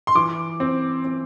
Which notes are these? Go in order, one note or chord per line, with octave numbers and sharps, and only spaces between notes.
C6
E3 D6
C4
C4